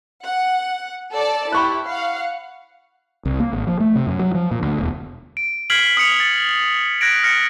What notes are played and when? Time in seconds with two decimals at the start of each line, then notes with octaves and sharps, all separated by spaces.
0.23 F#5
1.13 A4 D5 A5
1.52 E4 G4 B5 C#6 F#6
1.86 F5 F#5
3.25 C2
3.40 A#3
3.53 G#1
3.67 F3
3.80 A3
3.95 C3
4.07 F#2
4.19 F#3
4.34 F3
4.51 A#2
4.62 D2
4.79 E1
5.37 D7
5.70 F6 G#6 B6 C7 D7 F#7
5.97 D#6 F6 C#7 F7
6.20 A6 C#7
7.01 F#6 G#6 A#6 D7
7.24 F6 A#6 C#7 D7